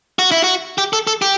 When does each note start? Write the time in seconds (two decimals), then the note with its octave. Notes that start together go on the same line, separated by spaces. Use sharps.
0.19 F#4
0.31 E4
0.44 F#4
0.78 G4
0.93 A4
1.07 A4
1.22 G4